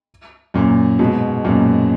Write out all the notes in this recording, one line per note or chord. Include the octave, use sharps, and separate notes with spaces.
F#2 A#2
G#2 B2
F#2 A#2